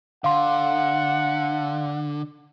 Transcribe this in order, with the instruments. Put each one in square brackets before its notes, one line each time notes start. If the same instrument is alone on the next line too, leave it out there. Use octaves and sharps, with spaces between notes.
[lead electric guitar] D3 [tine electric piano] F5 C6 [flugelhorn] F#5